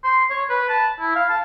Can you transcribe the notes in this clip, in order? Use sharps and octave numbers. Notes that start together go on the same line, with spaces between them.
C6
C#5
B4
A5
E4
F5
A5